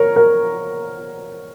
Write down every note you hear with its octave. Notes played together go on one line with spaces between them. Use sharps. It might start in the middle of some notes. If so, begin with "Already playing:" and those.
Already playing: A#4 C#5
A#4